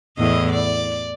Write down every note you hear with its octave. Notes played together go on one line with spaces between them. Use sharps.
E2 A2 D#5
D5